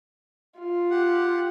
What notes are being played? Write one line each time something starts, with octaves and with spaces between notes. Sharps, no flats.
F4
G4 F#5